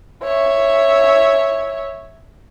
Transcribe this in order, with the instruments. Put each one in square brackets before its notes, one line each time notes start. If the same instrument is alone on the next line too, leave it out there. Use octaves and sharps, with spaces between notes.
[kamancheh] C#5 E5